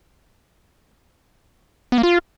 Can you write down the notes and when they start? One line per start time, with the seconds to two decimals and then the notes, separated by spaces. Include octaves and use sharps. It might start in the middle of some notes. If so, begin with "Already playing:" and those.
1.92 B3
1.98 A#3
2.03 F4